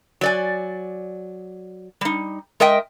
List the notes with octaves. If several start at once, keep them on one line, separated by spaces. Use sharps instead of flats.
F#3 D5 G#5
G3 D#4
G#3 A#4 D#5 E5 G5